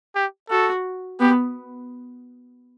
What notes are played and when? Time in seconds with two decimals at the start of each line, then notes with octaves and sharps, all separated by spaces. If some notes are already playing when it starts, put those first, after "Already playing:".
0.15 G4
0.50 F#4 A4
1.20 B3 G4